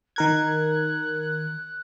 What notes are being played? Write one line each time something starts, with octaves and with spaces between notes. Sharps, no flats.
D#3 A#4 F#6 G#6